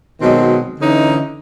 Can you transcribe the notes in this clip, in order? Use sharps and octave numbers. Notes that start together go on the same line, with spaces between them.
B2 D#3 F#3 G#3 C4
D3 E3 C#4 D#4